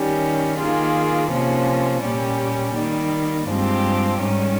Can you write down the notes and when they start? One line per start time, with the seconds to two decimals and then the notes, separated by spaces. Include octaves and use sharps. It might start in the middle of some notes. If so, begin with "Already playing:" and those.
Already playing: D#3 G3 C#4 G4
0.58 D#3 A#3 F4 G#4
1.31 C3 F3 A#3 C#4
2.03 A#2 G3 C#4 G4
2.76 D#3 G3 A#3
3.49 G2 F3 G#3 C4 G4
4.21 G#2 D#3 G3 C#4